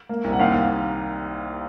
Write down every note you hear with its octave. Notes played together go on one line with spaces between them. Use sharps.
A#3
C2
F#5
D#2 F5
D#2